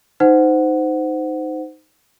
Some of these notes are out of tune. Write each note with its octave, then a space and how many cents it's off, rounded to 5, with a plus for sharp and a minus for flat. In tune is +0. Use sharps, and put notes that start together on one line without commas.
D#4 +0 C5 -20 F#5 +0